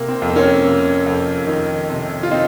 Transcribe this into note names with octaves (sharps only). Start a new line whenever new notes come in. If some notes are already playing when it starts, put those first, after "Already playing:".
Already playing: C3 A#3
C4
F2
C4
A#3 C#4
C3
F2
D#3
C3
F4
C4 D#4